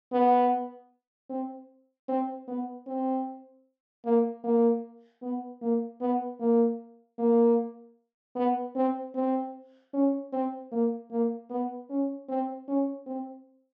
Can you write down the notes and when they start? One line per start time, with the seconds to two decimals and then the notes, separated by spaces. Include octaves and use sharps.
0.12 B3
1.30 C4
2.08 C4
2.48 B3
2.87 C4
4.05 A#3
4.44 A#3
5.22 B3
5.62 A#3
6.01 B3
6.40 A#3
7.19 A#3
8.36 B3
8.76 C4
9.15 C4
9.94 C#4
10.33 C4
10.72 A#3
11.11 A#3
11.50 B3
11.90 C#4
12.29 C4
12.68 C#4
13.07 C4